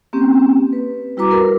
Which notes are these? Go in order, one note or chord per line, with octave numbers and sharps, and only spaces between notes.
A#3 C4 C#4 G4
B4
G3 E4 F#4 B4 A#5 D6
A#4 B4